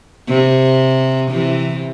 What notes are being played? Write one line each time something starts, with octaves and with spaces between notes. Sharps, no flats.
C3
C3 E3